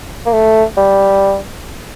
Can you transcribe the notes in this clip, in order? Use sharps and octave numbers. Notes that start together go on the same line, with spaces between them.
A#3
A3
G3